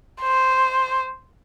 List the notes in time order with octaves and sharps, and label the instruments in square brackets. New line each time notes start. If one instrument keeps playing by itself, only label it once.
[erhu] C5